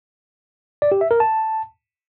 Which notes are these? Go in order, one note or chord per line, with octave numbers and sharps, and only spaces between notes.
D5
G4
E5
A#4
A5